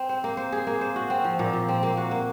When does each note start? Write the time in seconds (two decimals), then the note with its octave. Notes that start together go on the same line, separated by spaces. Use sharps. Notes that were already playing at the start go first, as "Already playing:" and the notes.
Already playing: C4
0.09 C5
0.24 A#3
0.37 C5
0.52 G#4
0.67 A#3
0.81 C5
0.96 F#4
1.10 C4
1.24 F3
1.39 A#2
1.53 F3
1.69 C4
1.83 A#3
1.97 F#4
2.11 A#3